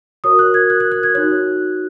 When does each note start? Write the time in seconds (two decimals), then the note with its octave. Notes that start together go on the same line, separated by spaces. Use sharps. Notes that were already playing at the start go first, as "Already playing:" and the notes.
0.24 F#4 A#4 C#5 D#6
0.39 F#6
0.54 G#6
0.70 F#6
0.80 F#6
0.92 F#6
1.03 G#6
1.14 D#4 F#4 C#5 F#6